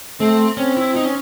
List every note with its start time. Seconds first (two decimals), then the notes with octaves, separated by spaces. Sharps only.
0.20 A3 C4
0.57 C4 C#4
0.77 E4
0.96 D#4
1.05 C#4